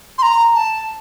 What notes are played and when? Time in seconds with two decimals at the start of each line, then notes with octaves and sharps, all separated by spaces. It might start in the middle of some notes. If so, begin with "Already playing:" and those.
0.18 C6
0.22 A#5
0.55 A5